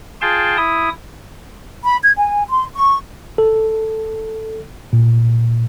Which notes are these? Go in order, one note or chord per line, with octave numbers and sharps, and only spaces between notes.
F4 G#4 G5 A5 C6
E4 D#6
B5
G#6
G#5
C6
C#6
A4
A#2